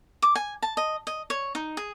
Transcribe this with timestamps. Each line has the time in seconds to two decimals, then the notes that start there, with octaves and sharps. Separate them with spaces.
0.22 D6
0.35 G#5
0.62 A5
0.77 D#5
1.07 D#5
1.30 C#5
1.55 D#4
1.77 G#4